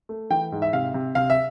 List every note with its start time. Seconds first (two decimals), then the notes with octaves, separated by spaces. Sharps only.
0.09 A3
0.30 E3 G5
0.52 G#2
0.62 E5
0.73 C3 F5
0.94 C3
1.15 C3 F5
1.30 E5